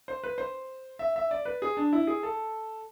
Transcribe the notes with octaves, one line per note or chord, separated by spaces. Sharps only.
C5
B4
C5
E5
E5
D5
B4
G#4
D4
E4
G#4
A4